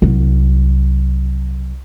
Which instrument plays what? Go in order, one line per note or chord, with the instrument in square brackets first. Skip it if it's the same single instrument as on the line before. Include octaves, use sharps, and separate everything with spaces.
[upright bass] C2 F#3